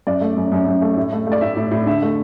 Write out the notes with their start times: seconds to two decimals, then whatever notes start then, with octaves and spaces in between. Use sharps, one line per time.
0.07 F#2 D5
0.21 A3
0.37 F#2
0.52 F#2
0.67 F#2
0.82 A3
0.97 A2
1.12 A3
1.26 A3
1.32 D5
1.41 A2 E5
1.57 A2
1.71 A2
1.86 D3 E5
2.02 A3